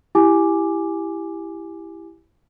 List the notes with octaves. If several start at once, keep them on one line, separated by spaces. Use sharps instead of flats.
E4 G4 G#5 D6